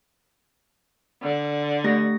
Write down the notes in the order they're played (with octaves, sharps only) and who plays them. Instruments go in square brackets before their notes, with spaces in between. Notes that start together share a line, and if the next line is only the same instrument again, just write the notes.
[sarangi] D3
[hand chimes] A3 G4 A#6